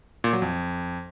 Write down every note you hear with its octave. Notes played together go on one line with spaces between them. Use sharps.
A#2
F#3
F2